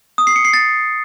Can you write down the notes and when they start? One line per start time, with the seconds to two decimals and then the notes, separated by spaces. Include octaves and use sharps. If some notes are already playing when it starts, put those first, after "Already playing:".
0.18 D#6
0.27 C7
0.36 C#7
0.45 C7
0.54 A6